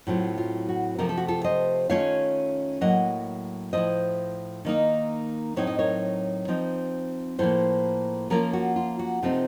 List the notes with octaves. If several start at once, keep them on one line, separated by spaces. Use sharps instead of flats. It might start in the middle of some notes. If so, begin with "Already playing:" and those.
A2 F#3 C4 F4
F4
F#4
C3 F3 A3 A#4
A4
F#4
F4 A4
C5 D#5
D#3 A3 C#4 F4 C#5 F5
A2 F#3 A#3 D#5 F#5
A2 F3 A3 C5 D#5
D#3 A#3 D#4
A2 F#3 C4 D#4 C#5
D#5
A#4 C#5
F3 C4 D#4
A2 F3 A#3 A4 C5
F3 A#3 C#4 F4 F#4 A#4
F#4
F4
F#4
C3 F3 A3 C4 D#4 F4